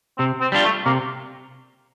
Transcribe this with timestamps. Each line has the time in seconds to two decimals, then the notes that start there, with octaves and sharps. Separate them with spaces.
0.18 C3 C4
0.41 C4
0.52 G3 D4 F4
0.64 A3
0.85 C3 A#3